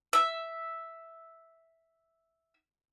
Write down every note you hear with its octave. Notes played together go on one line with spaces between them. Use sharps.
E5 E6